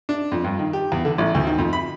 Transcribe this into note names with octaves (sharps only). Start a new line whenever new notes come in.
D4
F2
G2
D#3
G4
E2
D3
A1
D2
D#3
F2
B5